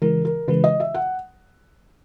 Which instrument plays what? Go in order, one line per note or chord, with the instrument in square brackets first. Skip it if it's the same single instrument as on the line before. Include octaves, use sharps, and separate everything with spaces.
[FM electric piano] C#3 E3 G#3 [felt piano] A#4
[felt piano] A#4
[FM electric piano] C#3 E3 G#3 [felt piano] B4
[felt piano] D#5
E5
F#5